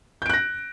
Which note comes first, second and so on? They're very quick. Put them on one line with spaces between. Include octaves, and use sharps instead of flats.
G6 D7 F#6 A#6